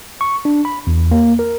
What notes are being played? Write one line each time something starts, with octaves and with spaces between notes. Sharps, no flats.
C#6
D4
B5
E2
A#3
A#4